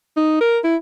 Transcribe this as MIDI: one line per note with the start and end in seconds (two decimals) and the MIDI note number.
0.17 0.37 63
0.41 0.59 70
0.64 0.76 64